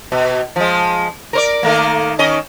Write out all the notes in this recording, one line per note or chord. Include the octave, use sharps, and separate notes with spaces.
B2
F3 G#3
A#4 C5 D5
D#3 A3 A#3
D#3 C#4 D#5